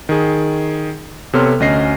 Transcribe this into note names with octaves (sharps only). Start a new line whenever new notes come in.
D#3 G#4
C3 B3 A4 C#5 C6 F6
D2 C#4 D#5 A#6 C7